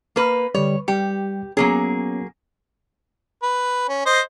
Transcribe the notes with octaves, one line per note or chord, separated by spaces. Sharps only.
A#3 B4
D3 G3 C#5
G3 G4 G5 C#7
F#3 A#3 B3 C#4 G#4
B4
C#4
C5 D#5